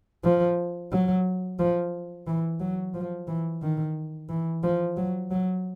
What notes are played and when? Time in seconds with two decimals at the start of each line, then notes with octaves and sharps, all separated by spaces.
0.24 F3
0.92 F#3
1.59 F3
2.27 E3
2.60 F#3
2.94 F3
3.28 E3
3.62 D#3
4.29 E3
4.63 F3
4.97 F#3
5.31 F#3